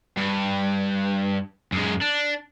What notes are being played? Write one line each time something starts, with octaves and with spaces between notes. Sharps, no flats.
G2
F#2 G#3
D4